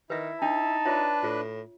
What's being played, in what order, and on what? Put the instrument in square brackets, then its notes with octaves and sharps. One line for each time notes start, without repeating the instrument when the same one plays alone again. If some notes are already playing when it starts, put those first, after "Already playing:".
[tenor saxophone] D#3 [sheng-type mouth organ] E4 [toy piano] B4 E5
[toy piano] D4 [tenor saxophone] D#4 [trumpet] A5
[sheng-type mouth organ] D4 B4 [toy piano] F4 C#5 E5
[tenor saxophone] A2 [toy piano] F4